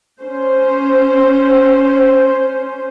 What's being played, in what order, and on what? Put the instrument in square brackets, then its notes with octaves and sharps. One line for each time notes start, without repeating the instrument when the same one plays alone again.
[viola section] C#4 C5